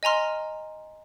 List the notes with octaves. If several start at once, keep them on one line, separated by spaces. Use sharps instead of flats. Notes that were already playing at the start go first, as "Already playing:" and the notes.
D#5 G#5 A#5 C6 F6